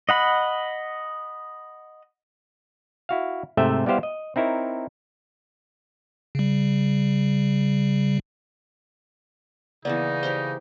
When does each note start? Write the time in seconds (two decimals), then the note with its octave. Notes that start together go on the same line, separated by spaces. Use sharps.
0.09 D#5 F#5 B5
3.09 E4 F#4 F5
3.57 G#2 C3 A3 E5 G5
3.86 G3 B3 E4 G4 C5 F5
4.03 D#5
4.36 C4 D#4 E4 A#4 C#5
6.35 C#3 G3
9.85 C#3 E3 A#3 B3 D#4 D5
10.23 G4 A#4 C5